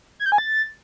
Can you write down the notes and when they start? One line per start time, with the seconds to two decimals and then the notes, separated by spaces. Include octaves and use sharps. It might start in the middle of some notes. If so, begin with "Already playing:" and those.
0.20 G#6
0.26 G6
0.32 G#5
0.38 A6